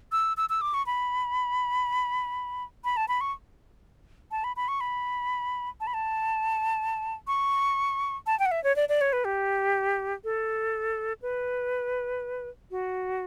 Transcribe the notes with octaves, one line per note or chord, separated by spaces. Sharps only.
E6
E6
E6
D6
C#6
B5
B5
A5
B5
C#6
A5
B5
B5
C#6
B5
A5
B5
A5
C#6
A5
G5
F#5
E5
C#5
D5
D5
C#5
B4
G4
A4
B4
F#4